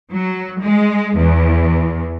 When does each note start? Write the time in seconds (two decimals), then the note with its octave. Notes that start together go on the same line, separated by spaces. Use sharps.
0.11 F#3
0.61 G#3
1.16 E2